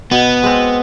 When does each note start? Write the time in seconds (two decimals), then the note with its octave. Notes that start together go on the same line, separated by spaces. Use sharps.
0.11 B2 B3
0.43 G#3 C4